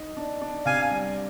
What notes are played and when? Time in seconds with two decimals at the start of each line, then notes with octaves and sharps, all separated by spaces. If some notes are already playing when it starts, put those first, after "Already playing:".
Already playing: D#4
0.17 D4
0.41 D4
0.66 C3 F5 G#5
0.91 G3